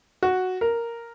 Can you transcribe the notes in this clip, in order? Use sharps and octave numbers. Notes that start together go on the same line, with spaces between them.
F#4
A#4